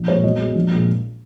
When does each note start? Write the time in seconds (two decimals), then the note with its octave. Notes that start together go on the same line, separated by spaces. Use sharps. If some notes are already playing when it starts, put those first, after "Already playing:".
Already playing: A#1
0.08 A#2 G#3 C#5
0.23 B1 D#5
0.40 B2 G#3
0.56 A#1
0.71 A#2 G#3